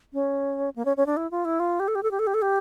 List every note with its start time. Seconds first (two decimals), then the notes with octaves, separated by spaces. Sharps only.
0.13 C#4
0.76 A#3
0.85 C#4
0.97 C#4
1.06 D4
1.17 E4
1.31 F4
1.45 E4
1.60 F4
1.80 G4
1.88 A4
1.95 G4
2.03 A4
2.11 G4
2.19 A4
2.27 G4
2.34 A4
2.42 G4